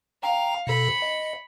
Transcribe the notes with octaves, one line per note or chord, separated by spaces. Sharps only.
F5 G5 A#5
B2 A4 B5 C#7
D#5